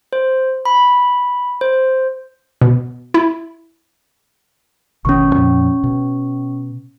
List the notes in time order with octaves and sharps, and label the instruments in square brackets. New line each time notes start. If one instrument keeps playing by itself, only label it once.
[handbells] C5
B5
C5
[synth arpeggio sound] B2
E4
[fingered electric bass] A1 B2 D#3 [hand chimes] C#4 C#6
[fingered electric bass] F2 A#2 F3
B2